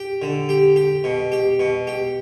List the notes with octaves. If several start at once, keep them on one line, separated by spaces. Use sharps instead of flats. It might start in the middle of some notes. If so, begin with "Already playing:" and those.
Already playing: G4
D3
G4
G4
B2
G4
B2
G4